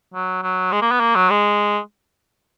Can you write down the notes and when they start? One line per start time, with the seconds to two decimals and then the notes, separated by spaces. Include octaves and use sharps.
0.14 F#3
0.43 F#3
0.72 G#3
0.82 A#3
0.91 B3
1.00 A#3
1.16 F#3
1.30 G#3